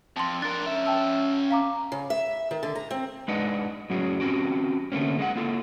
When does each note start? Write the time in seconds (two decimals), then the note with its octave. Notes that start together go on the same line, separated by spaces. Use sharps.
0.16 F2 A5 C6
0.42 D4 A#4 A6
0.66 C#4 E5
0.86 G5 A5 E6
1.51 F5 A#5 D6
1.92 C#3
2.10 E5
2.51 D#3
2.63 D3
2.75 A#5
2.90 C4
3.28 G#3 D4 D#4 B4 D#5 F#5
3.90 A2 F#3 C#4 F#4 G#4
4.20 C4 C#4 F#4 G4
4.92 D3 A3 A#3 C4 C#4
5.19 G#3 A#3 D4 F#5
5.36 A#3 F4 A4